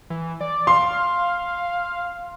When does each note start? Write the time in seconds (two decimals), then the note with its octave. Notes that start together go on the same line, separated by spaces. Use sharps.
0.10 E3
0.41 D5
0.67 F5 C6